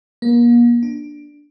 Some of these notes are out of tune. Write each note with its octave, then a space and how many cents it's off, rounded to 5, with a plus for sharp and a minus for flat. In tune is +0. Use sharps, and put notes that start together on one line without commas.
A#3 +35
D4 +10